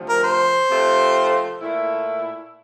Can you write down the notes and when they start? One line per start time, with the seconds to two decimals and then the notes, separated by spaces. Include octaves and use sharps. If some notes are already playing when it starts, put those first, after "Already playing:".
Already playing: D2 C3 F3
0.09 A#4
0.23 C5
0.69 C3 F3 A3 C4
1.60 A#2 A3 E4